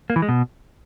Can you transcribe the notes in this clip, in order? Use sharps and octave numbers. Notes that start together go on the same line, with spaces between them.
A#3
E3
G#3
B2